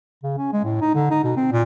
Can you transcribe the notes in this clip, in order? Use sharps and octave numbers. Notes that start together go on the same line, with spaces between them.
C#3
C#4
G#3
A2
D#4
D3
D#4
B2
C4
A#2